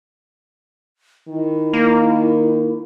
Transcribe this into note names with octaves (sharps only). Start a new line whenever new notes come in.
D#3 E4
A#3